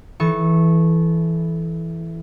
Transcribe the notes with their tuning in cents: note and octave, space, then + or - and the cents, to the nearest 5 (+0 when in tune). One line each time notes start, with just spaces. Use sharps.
E3 +0 A4 -25 C#6 -15